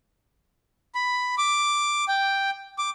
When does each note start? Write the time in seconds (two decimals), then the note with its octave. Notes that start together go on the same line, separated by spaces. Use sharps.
0.95 B5
1.38 D6
2.08 G5
2.78 D6